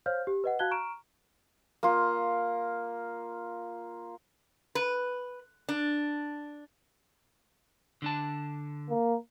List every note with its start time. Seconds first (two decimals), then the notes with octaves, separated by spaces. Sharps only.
0.06 C5 C#5 F5 F6 G6
0.27 G4
0.44 B4 D#5 F#5
0.59 F#4 F5 A5 F#6 G#6 G7
0.71 A#5 C#6 F6 D7 E7
1.83 A#3 F4
4.75 B4
5.69 D4
8.02 D3 D4 A5
8.90 A#3